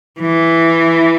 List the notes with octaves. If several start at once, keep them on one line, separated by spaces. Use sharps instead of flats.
E3